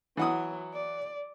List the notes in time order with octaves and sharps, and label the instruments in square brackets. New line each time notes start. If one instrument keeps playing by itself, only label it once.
[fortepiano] E3 F#5 D#6 [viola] F#3
[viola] D5